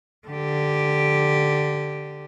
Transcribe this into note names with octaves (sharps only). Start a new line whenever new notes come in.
D3 G4